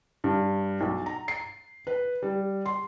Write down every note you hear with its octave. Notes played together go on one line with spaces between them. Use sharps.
G2
B1
A#5
C7
B4
G3
C6